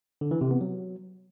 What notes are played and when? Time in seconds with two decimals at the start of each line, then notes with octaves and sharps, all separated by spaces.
0.21 D3
0.31 E3
0.41 C3
0.51 B3
0.61 F#3